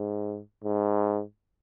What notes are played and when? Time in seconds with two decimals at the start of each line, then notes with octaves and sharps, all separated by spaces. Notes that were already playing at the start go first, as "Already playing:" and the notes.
Already playing: G#2
0.64 G#2